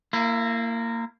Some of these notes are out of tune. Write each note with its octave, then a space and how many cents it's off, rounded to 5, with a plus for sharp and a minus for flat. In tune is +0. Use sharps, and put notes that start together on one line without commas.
A#3 -20 E4 +25